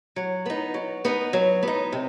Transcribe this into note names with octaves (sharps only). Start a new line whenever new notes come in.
F#3
B3 D#4
F#3
B3 D#4
F#3
B3 D#4
C3